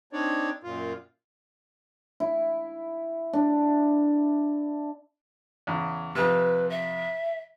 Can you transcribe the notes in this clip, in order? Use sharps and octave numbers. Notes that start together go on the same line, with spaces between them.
C4 D4 D#4 C#5 D5
F#2 A#2 F4
E4
D4
E2 C#3
F2 C3 B4
E5